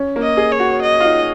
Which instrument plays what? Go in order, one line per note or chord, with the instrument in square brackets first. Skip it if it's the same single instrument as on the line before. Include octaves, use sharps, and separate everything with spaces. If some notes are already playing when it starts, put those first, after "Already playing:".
Already playing: [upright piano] C#4
A#3
[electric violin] D#5
[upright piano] G#4
[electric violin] C#5
[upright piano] F#4
[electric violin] D#5
[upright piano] F4
D#4